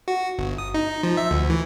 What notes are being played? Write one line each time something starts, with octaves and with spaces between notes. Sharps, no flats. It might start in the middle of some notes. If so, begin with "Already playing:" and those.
F#4
G1
D#6
D#4
F3
E5
D2
E3